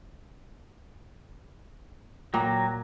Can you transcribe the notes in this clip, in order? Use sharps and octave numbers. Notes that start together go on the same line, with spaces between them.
A#2 F#3 G5 A#5